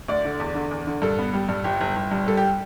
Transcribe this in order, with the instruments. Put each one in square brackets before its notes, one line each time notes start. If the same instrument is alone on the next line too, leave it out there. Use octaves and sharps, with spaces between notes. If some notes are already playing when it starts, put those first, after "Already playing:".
[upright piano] D2 D5
D3
E2
D3
E2
D3
G2 A4
B3
G3
G2
G1 G4
G1
G1
G2
G3 A4
G4